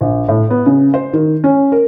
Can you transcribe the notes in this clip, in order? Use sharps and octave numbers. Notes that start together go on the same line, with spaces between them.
A#1
A2
B3
C#3
C5
D#3
C#4
A#4